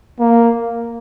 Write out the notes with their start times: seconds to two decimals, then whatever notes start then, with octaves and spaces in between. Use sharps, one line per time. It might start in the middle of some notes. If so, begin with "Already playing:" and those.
0.19 A#3